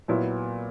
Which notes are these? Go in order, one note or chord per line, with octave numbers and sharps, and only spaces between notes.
A#2 F#3 B3 E4